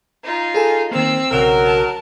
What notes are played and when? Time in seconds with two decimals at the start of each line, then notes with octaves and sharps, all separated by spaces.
0.23 D#4 F4
0.54 G#4 A4 G#5
0.91 D#3 A#3 C4 E6
1.31 B1 C#3 F#3 A#4
1.65 A5